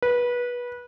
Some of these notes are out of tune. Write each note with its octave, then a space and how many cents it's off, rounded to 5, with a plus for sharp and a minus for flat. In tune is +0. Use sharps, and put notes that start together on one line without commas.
B4 -20